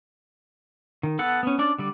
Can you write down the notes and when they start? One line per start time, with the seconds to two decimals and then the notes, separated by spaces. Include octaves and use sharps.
1.03 D#3
1.19 B3 A4 F#5 A5
1.43 B3 C#4
1.58 C#4 D4 D5
1.79 D3 G3 D5